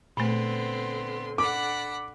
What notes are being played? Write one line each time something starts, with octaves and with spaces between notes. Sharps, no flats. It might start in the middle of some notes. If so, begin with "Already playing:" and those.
A#2 D3 A3 B3 C4 C6
D4 A4 F#5 B5 D6